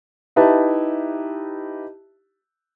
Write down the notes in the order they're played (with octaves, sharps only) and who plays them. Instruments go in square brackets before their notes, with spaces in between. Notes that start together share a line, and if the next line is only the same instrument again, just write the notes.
[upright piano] D#4 E4 G4 B4 E5 A5